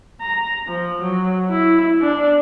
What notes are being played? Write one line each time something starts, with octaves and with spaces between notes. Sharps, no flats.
A#5
F3
F#3
E4
D4